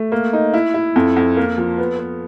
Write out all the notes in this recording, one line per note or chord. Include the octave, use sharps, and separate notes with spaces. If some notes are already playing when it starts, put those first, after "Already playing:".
Already playing: A3
A#3
D#4
E4
E4
F2
F2
A#3
F3
B3
B3